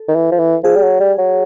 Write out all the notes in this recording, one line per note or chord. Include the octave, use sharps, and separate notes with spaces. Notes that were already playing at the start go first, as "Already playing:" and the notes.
Already playing: A4
D#3
E3
F3
E3
F3 G#4
G3
F#3
G3
F#3